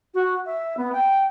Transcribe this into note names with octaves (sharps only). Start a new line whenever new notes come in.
F#4
E5
B3
G5